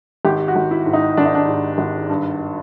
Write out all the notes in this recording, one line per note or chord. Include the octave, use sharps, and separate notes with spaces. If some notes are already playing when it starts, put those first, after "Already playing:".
G#1 G4
F#4
G#1
E4
G#2
D#4
G#1 D4
D#4
D4
G#2
G#1
G2